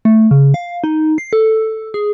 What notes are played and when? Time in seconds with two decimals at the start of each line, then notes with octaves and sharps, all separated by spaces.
0.05 A3
0.31 C#3
0.54 F5
0.84 D#4
1.18 C7
1.33 A4
1.94 G#4